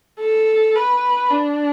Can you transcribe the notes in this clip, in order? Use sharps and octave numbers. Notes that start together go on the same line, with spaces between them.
A4
B4
D4